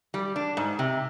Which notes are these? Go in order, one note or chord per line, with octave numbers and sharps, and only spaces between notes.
G3
D4
G#2
C3